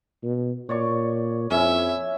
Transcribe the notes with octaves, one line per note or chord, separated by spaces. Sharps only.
B2
A#2 C#5 D5 C#6
F2 C#4 E4 E5